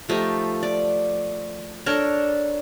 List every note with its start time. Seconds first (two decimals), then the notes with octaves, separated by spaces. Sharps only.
0.09 F3 A3 D#4 G4
0.63 D5
1.86 D4 A4 A#4 C#5